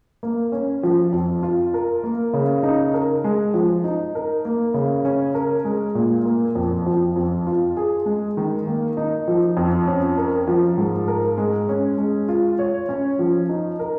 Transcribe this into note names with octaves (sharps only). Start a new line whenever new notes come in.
A#3
C#4
F3
F2
F4
A#4
A#3
C#3
D#4
A#4
G#3
F3
D#4
A#4
A#3
C#3
C#4
A#4
G#3
A#2
A#3
F2
F3
F2
F4
G#4
G#3
D#3
A#3
D#4
F3
F2
C#4
A#4
F3
G#2
A#4
G#3
C#4
G#3
F4
C#5
C#4
F3
D#4
A#4